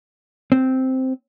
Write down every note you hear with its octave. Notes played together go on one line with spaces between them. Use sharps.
C4